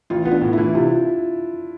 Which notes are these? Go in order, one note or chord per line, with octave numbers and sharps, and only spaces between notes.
A1 F4
B3
D4
A2
E3 E4
C3 F4